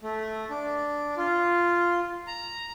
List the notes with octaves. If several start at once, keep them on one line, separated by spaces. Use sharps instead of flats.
A3
D4
F4
A#5